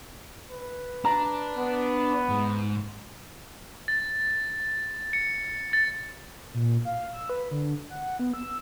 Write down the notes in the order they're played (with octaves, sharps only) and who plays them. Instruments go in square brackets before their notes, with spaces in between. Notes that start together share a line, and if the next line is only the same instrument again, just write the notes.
[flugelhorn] B4
[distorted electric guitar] D4 [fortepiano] A#5
[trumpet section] B3
[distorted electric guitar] G#2
[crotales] A6
C#7
A6
[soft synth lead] A#2
F5
E6
B4
D3
F#5
B3
E6